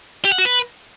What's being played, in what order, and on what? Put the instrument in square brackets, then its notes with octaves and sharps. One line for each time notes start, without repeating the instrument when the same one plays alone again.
[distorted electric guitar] G4
F#5
F#4
B4